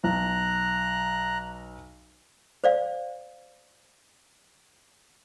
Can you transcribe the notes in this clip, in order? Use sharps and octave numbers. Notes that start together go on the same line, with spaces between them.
B1 A#5 F#6
C5 D5 F5